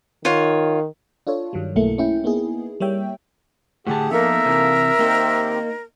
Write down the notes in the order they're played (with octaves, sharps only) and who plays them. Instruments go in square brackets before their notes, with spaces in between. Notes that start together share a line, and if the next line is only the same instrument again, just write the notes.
[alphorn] D#3 [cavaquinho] F4 C#5 F#5
[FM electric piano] D4 F4 A4 C#5
G2 D#3 F#3 G3
B1 F#3 A3 A#3 E4 C#7
C#4 E4 G5
A#3 B3 D#4 E4 G#4
G3 A#3 C#5 E5 G5
[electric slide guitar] A2 D3 A5 [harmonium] G4 G#4 F#5
[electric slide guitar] F3 B3 [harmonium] A#3 D#4 A4 [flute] A#4 [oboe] E5
[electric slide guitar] C3 E3
[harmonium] D#3 C4 G4 [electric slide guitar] A#3 D#4